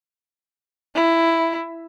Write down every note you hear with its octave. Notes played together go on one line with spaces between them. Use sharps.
E4